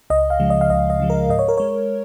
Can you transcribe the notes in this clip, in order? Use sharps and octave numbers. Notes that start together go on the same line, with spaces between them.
C#2 D#5
F5
C#3 F3 G#3
D#5
F5
C#2 D#5
D#5
C#3 F3 G#3
A#4
G#2 D#5
C#5
A#4
G#3 C#5